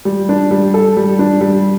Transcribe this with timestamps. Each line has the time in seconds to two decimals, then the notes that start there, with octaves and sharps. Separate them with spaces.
0.05 G3
0.29 D4
0.51 G3
0.74 A4
0.97 G3
1.19 D4
1.41 G3